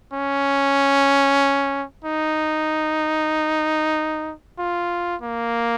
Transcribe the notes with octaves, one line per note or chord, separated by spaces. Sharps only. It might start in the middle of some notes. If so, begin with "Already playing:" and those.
C#4
D#4
F4
A#3